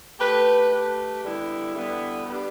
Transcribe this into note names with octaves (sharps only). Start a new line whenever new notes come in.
A3 G4 B4
A3 G4 B4
D3 G3 B3 E4
D3 G3 B3 E4
G3 B3 D4